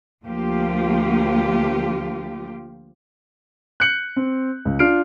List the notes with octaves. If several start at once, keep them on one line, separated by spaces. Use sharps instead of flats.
D2 F3 A#3 F4 G4
F#6 G6 C#7 F#7
C4
C#2
D4 F4 F6 C7 D7